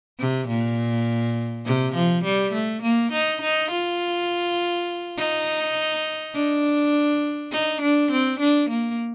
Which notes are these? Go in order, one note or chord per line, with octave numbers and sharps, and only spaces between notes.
C3
A#2
C3
F3
G3
A3
A#3
D#4
D#4
F4
D#4
D4
D#4
D4
C4
D4
A#3